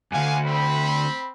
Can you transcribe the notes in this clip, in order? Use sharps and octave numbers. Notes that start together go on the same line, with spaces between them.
D2 G2 F5 F#5 G#5
C4 B5